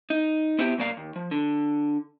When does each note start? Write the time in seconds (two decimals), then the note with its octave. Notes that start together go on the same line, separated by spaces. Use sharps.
0.10 D#4
0.59 B3 C4 E4 G4
0.78 F#2 B2 A#3 D5 F5
0.97 D#2
1.16 F3
1.31 D3